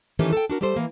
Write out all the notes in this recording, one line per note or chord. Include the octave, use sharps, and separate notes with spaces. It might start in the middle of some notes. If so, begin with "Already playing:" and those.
D#3 E3 A3 C#4 G4 B4
A4 G5
D4 F#4 A#4
G3 A3 G4 A4 C5
E3 A#3